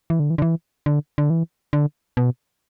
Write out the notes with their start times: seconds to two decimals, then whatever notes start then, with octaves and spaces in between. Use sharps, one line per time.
0.10 E3
0.20 D3
0.30 E3
0.38 D3
0.42 E3
0.86 D3
1.18 D3
1.30 E3
1.73 D3
2.17 B2